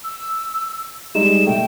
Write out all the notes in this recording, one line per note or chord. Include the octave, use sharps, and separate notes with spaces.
E6
G3 G#3 D#4 E7
B2 A3 G5